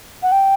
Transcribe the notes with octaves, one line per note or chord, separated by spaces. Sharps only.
F#5
G5